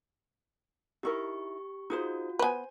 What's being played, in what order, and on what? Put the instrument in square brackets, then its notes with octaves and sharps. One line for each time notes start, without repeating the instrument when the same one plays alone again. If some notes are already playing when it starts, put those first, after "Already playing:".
[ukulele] D#4 E4 A#4 [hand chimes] G4 C#6
[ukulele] D#4 G#4 C5 [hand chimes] F4 F#4
[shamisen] B3 B4 [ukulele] C5 G#5